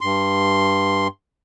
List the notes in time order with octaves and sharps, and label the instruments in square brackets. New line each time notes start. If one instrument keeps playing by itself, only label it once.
[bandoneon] G2 C6